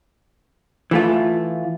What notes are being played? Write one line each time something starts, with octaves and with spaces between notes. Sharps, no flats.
E3 A3 F4